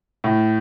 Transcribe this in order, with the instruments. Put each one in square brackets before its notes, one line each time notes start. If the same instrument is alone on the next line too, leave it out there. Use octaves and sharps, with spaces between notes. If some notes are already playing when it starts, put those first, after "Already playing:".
[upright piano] A2